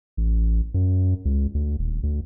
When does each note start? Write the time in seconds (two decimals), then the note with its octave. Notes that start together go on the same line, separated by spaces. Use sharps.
0.17 A1
0.74 F#2
1.25 C#2
1.54 D2
1.79 D#1
2.03 D2